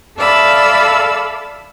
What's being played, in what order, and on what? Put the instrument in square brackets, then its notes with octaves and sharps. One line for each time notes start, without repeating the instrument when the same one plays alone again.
[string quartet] A4 D5 E5 F5 B5 E6